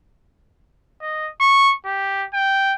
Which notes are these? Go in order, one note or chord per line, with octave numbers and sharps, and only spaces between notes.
D#5
C#6
G4
G5